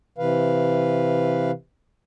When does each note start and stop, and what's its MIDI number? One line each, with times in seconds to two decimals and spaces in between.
0.18 1.51 48
0.18 1.51 52
0.18 1.51 71
0.18 1.51 77